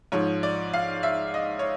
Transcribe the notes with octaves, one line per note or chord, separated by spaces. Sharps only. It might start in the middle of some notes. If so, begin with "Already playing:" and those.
G#2 F3 C#5
D5
F5
E5
D#5
C#5